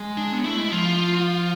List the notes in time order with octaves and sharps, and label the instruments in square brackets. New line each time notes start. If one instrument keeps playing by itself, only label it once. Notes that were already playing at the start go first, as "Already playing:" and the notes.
Already playing: [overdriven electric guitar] G#3
[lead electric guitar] D4
[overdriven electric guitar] B3
[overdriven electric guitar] A3 [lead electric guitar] E4
[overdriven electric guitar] G#3
[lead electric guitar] E4
[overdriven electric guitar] F3 [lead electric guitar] F4